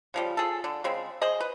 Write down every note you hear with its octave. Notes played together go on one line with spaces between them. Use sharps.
C#3 F3 G3
F4 G#4 A4
D3
C#3 G#3 C4
G#4 C5 D#5
B4